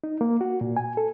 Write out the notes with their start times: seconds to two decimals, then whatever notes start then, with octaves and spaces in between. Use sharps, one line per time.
0.04 D#4
0.21 A#3
0.41 F#4
0.61 A#2
0.77 G#5
0.97 A4